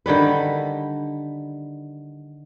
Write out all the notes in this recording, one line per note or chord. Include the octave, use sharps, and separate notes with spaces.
D3 D#3 G3 B4